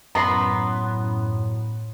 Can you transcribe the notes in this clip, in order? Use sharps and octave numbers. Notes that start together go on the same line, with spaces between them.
F#2 A2 B3 A#5 C6